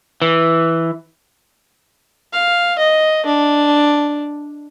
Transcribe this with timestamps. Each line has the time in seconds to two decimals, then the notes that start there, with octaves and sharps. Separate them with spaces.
0.22 E3
2.33 F5
2.79 D#5
3.26 D4